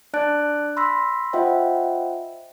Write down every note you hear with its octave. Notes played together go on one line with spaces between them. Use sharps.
D4 D5 A5 F#6 A6 D7
B5 C6 E6 A#6 B6
F4 C5 D#5 E5 F#5 G5